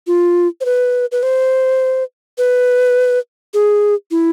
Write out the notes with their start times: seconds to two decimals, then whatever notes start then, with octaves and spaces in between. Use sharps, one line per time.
0.07 F4
0.61 C5
0.65 B4
1.12 B4
1.23 C5
2.38 B4
3.54 G#4
4.11 E4